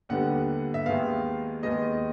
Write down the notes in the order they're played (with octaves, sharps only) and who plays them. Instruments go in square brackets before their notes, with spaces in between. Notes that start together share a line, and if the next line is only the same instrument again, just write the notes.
[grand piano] D#2 D3 G3 B3 F#5
E5
D#2 D#3 G#3 B3 F5
D#2 D#3 G#3 B3 D#5